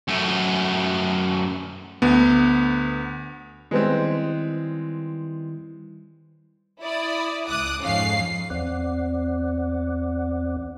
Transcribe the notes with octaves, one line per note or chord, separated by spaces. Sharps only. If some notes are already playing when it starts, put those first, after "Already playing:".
F#2 A3
D2 B3
D#3 G3 G#3 B3 C4 E4
E4 D5 D#6
C#2 D6 D#6 F#6
F2 G#2 C#4 F5 C7
E2 C4 D5 F#5